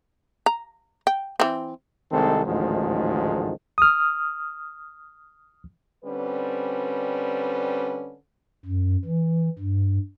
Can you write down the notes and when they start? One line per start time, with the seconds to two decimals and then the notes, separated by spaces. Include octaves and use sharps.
0.46 A#5
1.07 G5
1.40 E3 C4
2.12 C2 D#3 G#3 C4 A4
2.46 A1 D2 G#2 D#3 F3
3.78 D#6 F6
6.04 D3 G3 C4 C#4 B4
8.65 F#2
9.05 E3
9.59 G2